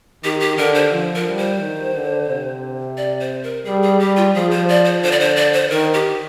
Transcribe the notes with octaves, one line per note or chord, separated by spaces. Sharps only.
D#3 G4
G4
D3 A#4
C5
F3
A#4
G3
C5
D#3
D3
C3
D5
C5
A#4
G3 G#4
G#4
G3 G4
F4
F3 G#4
C5
D5
C5
D3 C5
D5
C5
D5
C5
D#3 A#4
G4